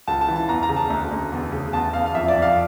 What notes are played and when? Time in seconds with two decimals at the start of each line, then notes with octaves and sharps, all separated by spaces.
0.08 C#2 A5
0.21 A5
0.28 E3
0.36 A5
0.49 E2 A#5
0.63 A#5
0.69 C#3
0.76 A5
0.90 D2
1.11 D2
1.32 E2
1.52 C#3
1.73 E2 A5
1.93 E2 F5
2.06 F5
2.14 F2 E5
2.28 D5
2.35 F2
2.42 F5